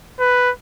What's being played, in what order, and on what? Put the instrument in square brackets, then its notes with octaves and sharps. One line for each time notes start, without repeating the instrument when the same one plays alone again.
[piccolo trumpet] B4